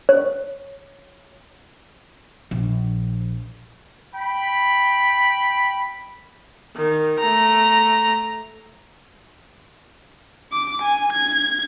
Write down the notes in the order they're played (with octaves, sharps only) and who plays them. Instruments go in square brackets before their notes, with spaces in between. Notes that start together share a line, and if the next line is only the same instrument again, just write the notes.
[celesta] C#5
[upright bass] A#1
[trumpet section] G5 B5
[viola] D#3
A3 A#5
[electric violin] D6
G#5
G#6